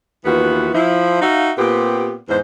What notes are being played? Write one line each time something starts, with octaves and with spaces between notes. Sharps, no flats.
D#2 E3 B3 F4 F#4
F3 E4
D#4 F#4 E5 F5
A#2 B3 C4 G4
E2 G#2 C5